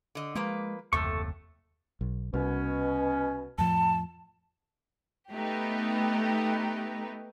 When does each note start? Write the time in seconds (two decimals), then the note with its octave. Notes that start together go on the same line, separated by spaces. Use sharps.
0.15 D3 D#5
0.35 F3 G#3 A#3 B4
0.93 F#1 D#2 C3 A3 A4 C#6
2.01 B1
2.34 C2 B2 C#4
3.58 F2 A2 F3 A5
5.32 A3 B3 D#4 G4